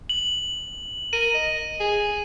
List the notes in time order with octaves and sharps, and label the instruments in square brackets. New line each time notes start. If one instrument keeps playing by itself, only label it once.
[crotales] F#7
[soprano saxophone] A#4 [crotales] D#7
[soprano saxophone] D#5
G#4